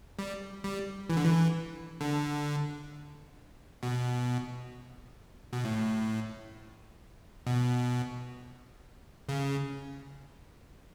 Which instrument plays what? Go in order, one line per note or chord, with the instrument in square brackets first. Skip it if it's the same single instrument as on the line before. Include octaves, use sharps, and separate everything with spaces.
[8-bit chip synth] G3
G3
E3
D3
E3
D3
B2
B2
A2
B2
C#3